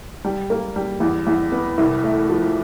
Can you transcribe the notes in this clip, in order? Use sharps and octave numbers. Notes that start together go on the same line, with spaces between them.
G3
A#3
G3
E2
E2
B3
C2
A3
F3